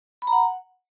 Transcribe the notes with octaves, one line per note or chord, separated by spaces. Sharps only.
B5
A#5
F#5